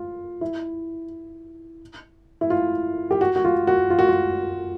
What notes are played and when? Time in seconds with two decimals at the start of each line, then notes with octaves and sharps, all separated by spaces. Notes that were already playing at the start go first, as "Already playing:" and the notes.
Already playing: F4
0.41 E4
2.41 E4
2.50 F4
3.11 G4
3.21 F#4
3.36 F#4
3.44 F4
3.67 F#4
3.90 F4
3.99 F#4
4.08 F4